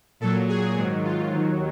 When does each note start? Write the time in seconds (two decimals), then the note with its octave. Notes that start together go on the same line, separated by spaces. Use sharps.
0.20 A#2 F#3 A4
0.49 G#4
0.77 G#2 D#3 F#3
1.05 F4
1.33 D#2 D#3 F#3